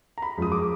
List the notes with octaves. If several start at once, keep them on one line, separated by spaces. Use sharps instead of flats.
A#5
B5
F#2 F3 G#3 D#6
D6